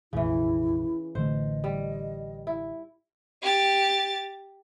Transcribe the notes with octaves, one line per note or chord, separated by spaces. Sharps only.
F1 A#1 E2 C#3 E3 E4
A1 D3 A3 C5 D#5
G3
E4
G4 A6